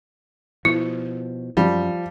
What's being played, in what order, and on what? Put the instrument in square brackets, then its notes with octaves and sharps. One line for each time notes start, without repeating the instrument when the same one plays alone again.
[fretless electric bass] B2 F3 [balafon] E4
[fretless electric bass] F#2 [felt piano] F3 [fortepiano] G3